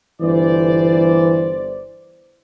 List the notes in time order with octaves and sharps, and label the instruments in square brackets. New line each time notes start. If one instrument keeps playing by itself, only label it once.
[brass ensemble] G1 C5 D5 [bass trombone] E3